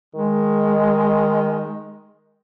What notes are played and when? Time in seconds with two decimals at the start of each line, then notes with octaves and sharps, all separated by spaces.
0.15 D#3 G#3